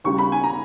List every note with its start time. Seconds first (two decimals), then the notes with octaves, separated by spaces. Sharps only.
0.04 D#2 C#3 G3 C#6
0.18 B5
0.32 G#5
0.43 A#5